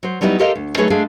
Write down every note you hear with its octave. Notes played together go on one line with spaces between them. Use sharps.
F#3 C5
F#3 G3 B3 D#4 E4
G4 A4 A#4 C5 D#5 F5
D2
F#3 A3 D#4 G#4 B4 C#5
G#3 A3 D4 G#4 F5